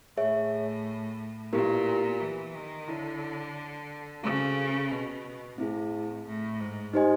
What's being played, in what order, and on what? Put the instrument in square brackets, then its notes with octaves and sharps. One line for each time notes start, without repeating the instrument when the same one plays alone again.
[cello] A2 [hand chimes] G#4 C#5 E5
[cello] A#2 [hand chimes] B3 E4 G4 A#4
[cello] E3
D#3
[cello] D3 [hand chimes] E4 A4 C#5
[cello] C#3 [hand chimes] C#4 F#4 A4 C5 F5
[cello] B2
[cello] A2 [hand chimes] C4 E4 G#4
[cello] A2
G#2
[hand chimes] D#4 G4 C5 D#5 G#5